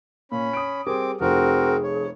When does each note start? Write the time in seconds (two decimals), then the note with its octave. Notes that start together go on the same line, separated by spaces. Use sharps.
0.32 A#2 C#4 B5
0.53 D#6 D7
0.87 G3 C4 G#4 A#4 D6
1.21 F1 F2 C4 F#4 G#4 A#4
1.83 C#5